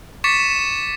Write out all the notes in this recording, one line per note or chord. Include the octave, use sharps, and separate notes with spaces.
C#6 D6 A6 B6 C#7 E7